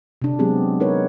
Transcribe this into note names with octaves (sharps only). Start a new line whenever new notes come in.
C3 D4
F#3 G#3 B3 C4 G4 G#4
D#4 A#4 B4 C#5